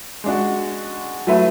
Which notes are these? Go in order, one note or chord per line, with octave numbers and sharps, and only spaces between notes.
G#3 D4 F#4
F#3 A3 E4 B4